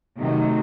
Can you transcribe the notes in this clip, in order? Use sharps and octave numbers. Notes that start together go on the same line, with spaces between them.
C3 D#3 F#3 A3 D#4